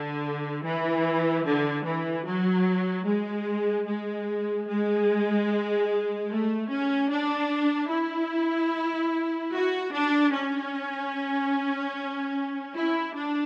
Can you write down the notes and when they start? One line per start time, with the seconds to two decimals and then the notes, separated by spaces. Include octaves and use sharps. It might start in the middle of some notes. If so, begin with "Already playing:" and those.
Already playing: D3
0.64 E3
1.44 D3
1.85 E3
2.25 F#3
3.06 G#3
3.87 G#3
4.68 G#3
6.29 A3
6.70 C#4
7.10 D4
7.90 E4
9.52 F#4
9.93 D4
10.33 C#4
12.75 E4
13.15 D4